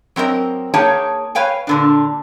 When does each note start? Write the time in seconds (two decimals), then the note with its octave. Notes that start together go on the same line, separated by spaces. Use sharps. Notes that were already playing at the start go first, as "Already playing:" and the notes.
0.16 F#3 C4 A#4 D#5
0.74 A#3 D#4 G#4 C#5 G5 A5
1.35 B4 C#5 F5 G5 G#5
1.67 A#2 D3 D4